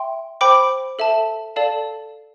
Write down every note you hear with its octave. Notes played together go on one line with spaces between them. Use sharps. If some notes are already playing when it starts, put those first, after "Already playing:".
Already playing: E5 G5 C6
C5 G5 B5 D6
A4 E5 A5
A4 D5 F5 A5